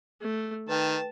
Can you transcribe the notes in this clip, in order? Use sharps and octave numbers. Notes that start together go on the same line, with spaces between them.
A3
D#3 B4 G5 A5